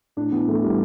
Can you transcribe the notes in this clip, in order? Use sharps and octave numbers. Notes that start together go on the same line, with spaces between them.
A2 D4
E3 B3
A2 A3
E3 G3